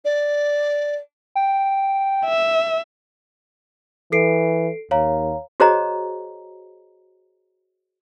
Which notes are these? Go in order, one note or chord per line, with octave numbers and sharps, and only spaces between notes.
D5
G5
E5
E3 A4 C7 D7
D#2 C#5 F5 A#5
F#4 G#4 C5 C#5 D#5 A#5